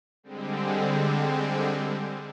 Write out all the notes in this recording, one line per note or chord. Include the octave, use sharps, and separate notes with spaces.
D3 G3 G#3 C4